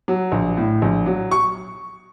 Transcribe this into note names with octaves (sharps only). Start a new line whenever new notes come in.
F#3
A#1
A2
A#1
F#3
C#6